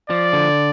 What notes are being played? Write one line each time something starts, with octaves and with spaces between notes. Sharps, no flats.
F3 D5
D3